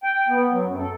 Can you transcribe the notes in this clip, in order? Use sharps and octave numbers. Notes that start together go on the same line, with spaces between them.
G5
B3
F#3
F#2
A4